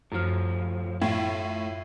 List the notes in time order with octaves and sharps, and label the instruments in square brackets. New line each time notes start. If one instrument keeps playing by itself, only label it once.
[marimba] F#2 F6 [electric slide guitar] A2 F3
[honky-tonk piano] A2 [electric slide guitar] E4 F4